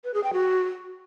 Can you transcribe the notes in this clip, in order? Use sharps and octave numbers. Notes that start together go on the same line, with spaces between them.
B4
G#4
G5
F#4